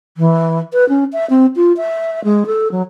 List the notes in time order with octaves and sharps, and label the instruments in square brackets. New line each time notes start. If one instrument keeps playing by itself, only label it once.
[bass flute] E3
B4
C#4
E5
C4
F4
E5
G#3
A4
F#3